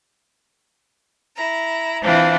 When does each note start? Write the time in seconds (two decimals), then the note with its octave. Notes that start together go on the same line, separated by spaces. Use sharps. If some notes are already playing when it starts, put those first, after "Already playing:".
1.35 E4 A#5
2.02 E3 C4 D4 E4 F4